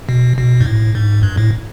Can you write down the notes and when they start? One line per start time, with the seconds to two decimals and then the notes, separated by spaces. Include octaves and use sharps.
0.09 B2
0.38 B2
0.61 G#2
0.66 A2
0.95 G#2
1.23 G2
1.37 A2